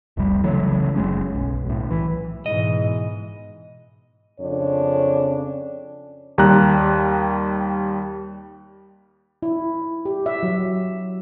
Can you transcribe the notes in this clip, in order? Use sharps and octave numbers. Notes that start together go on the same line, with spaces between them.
F1 C2 C3 G3
C#3 E3 F#3 A3
F#1 G#3 C#4
B1
B1 A2
E3
G#2 B2 E3 D#5
F2 C#3 D4 C#5
D#2 G3 A#5 F#6
E4
G4
E5
F#3